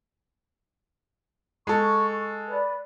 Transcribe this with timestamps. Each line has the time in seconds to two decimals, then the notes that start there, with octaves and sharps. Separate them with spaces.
1.67 G#3 A4 C#6
2.47 B4 D5